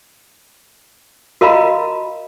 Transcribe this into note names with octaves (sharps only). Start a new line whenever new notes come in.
F#4 A#4 D#5 F5 A#5 B5